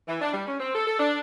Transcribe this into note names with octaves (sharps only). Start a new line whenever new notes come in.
E3
D4
G3
C#4
C4
A4
A4
D4